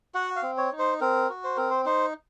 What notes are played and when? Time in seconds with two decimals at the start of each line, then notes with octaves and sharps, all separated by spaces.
0.14 F#4 F#5
0.36 F5
0.43 C4
0.58 C#5
0.72 D#4
0.79 C5
1.01 C4 A#4
1.29 F#4
1.44 C5
1.57 C4 A#4
1.70 C5
1.86 D#4 C5